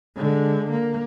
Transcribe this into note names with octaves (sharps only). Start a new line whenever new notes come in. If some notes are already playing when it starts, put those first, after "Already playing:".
D3 G#3
A#3